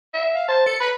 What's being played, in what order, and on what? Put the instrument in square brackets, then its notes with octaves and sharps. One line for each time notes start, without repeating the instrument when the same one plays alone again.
[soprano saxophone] E5
[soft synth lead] F5
[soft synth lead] C5 [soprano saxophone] A5
[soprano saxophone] A4 [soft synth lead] C#7
[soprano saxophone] B4 [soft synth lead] B5